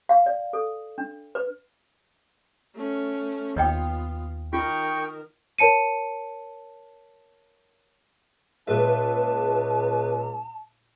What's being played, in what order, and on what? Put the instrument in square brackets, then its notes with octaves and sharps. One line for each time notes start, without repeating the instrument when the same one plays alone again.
[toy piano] F5
D5
A4
D4
B4
[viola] A3 C#4
[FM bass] D#2 [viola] B3 F4 [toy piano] C#5 D#5 G5
[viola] D#3 A#4 [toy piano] F4 [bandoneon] G5 C#6
[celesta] A#4 C#5 A5 C#7 D#7
[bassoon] C#2 [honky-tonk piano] A#2 G#3 E5 [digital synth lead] B4 [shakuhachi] A5